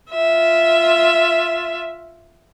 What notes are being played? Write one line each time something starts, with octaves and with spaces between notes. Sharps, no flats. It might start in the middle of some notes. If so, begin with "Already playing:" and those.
F4 E5